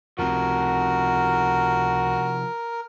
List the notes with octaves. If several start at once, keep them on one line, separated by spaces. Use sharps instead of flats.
C#2 C3 F3 F#4 A#4